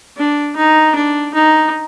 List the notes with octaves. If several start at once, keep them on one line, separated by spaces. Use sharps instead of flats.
D4
D#4
D4
D#4